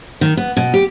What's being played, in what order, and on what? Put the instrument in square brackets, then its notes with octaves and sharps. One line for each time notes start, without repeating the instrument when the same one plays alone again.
[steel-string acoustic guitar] D#3
B3
B2
G4